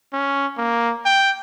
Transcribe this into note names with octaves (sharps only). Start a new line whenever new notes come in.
C#4
A#3
G5